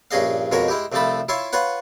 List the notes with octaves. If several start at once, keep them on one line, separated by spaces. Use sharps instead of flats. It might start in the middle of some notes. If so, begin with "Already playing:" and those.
A#1 G2 C#4 G#4 D#5 F5
F2 B2 G#3 A#4 C#5
G#3 E4 G4
C2 C3 F3 A3 A5 B5
E4 F4 C#5 E5 F5
F4 B4 C#5 F#5